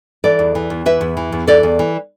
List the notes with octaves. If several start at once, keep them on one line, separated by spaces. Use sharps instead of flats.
E3 A4 D5
E2
E3
E2
E3 B4 E5
E2
E3
E2
E3 A4 D5
E2
E3